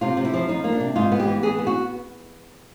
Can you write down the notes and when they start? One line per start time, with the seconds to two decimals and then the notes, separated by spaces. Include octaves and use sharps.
0.01 C3 F4
0.17 C3
0.25 E4
0.34 F3
0.49 F3 D#4
0.64 A#3
0.72 D4
0.80 C3
0.96 G#2 F4
1.12 B3
1.20 G4
1.27 E3
1.43 B3 G#4
1.59 B3
1.67 F#4